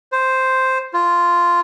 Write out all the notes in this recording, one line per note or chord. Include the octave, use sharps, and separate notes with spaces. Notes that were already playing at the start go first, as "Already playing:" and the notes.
C5
F4